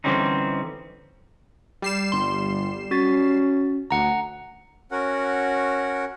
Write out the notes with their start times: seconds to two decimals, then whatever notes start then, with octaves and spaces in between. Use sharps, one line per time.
0.04 D3 E3 G3 C4 C#4 D#4
1.82 G3 C7 E7
2.12 G1 C6
2.91 C#4 F#4 A6
3.91 D2 F#5 A#5
4.91 C#4 F#4 A#4 F#5